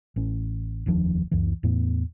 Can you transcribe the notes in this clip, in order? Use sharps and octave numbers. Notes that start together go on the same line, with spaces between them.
A1 C#4
F1 D#2 F3 D4
C#2 F#2 E3
E2 A2 B3